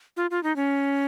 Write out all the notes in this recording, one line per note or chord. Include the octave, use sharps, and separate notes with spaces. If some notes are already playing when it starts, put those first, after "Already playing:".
F4
F4
D#4
C#4